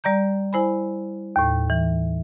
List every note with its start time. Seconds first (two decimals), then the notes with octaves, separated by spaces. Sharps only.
0.04 G3 D5 A#5 G6
0.53 E4 C5 G#5 B5
1.36 D#2 A2
1.70 E3